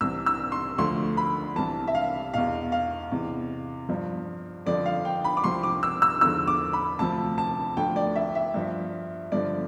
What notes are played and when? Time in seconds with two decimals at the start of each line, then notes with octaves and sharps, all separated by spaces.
0.01 C2 C3 E3 E6
0.26 E6
0.52 C6
0.78 D2 D3 F3 C6
1.17 B5
1.56 C2 C3 E3 A5
1.88 E5
1.95 F5
2.34 E2 B2 F5
2.72 F5
3.11 E2 C3 E3
3.89 G2 F3
4.66 F2 D3 F3 D5
4.86 F5
5.05 G5
5.25 B5
5.37 D6
5.44 C2 C3 F3 C6
5.63 D6
5.83 E6
6.02 E6
6.21 E2 D3 F3 E6
6.47 D6
6.73 B5
6.99 D2 C3 F3 A5
7.38 A5
7.77 D2 D3 F3 G5
7.96 D5
8.16 E5
8.35 E5
8.54 G2 F3
9.32 G2 D3 F3 D5